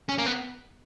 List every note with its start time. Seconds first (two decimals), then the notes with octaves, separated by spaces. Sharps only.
0.09 C#4
0.18 A#3
0.26 B3